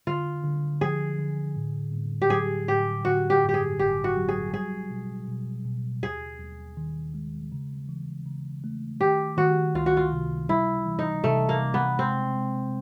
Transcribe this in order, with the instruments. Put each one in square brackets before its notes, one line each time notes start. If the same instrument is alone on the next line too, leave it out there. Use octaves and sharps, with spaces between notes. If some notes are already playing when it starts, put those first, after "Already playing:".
[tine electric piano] D3 [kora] F4
[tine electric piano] D3
[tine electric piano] F3 [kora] G#4
[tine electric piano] D3
A2
A2
[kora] G4
[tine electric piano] F#3 [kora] G#4
[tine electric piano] A2 [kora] G4
[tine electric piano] D3 [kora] F#4
[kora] G4
[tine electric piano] G2
[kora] G4
G#4
[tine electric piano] G#1 [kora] G4
[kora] F#4
[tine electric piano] F#3
[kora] G#4
[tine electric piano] G3 [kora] G#4
[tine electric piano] B2
B2
B2
[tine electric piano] D#2 [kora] G#4
[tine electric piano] D#2
D#3
G#3
C#3
E3
C#3
A3
[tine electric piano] D#3 [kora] G4
[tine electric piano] D#3 [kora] F#4
[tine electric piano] C#2 [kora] F4
[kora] F#4
F4
[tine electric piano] C3
[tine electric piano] G3 [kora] E4
[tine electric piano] E3
[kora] D#4
[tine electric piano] C3 [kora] A3
[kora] A#3
[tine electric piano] C3
[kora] B3
[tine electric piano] G#3 [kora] C4
[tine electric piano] G#3